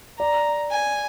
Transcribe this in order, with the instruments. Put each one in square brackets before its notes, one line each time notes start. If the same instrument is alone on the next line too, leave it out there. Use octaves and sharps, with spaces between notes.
[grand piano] D5 [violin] A#5
[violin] G#5